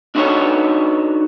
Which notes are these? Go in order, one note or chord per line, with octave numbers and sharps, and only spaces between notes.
D4 D#4 F#4 A4 C#5